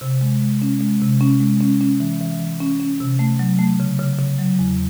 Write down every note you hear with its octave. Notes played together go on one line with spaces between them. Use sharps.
C3
G#3
G#3
C#4
G#3
C3
C#4
G#3
C#4
C#4
E3
E3
E3
C#4
C#4
C3
A3
F#3
A3
C#3
C#3
C#3
F#3
E2